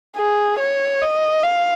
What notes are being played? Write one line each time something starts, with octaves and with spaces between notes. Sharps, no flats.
G#4
C#5
D#5
F5